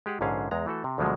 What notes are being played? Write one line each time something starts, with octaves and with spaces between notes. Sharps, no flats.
G#3 G4 G#4 F#5
A#1 G#2 D3 C#4 G#4 F5
E2 G#3 A#5
E3 A3 F#4 A4
C3
D2 B2 D3 F3 F#3 G#3